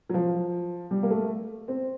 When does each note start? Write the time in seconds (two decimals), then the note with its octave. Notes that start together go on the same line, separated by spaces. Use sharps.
0.09 F#3
0.14 F3
0.91 G3
1.03 A#3
1.10 A3
1.68 C4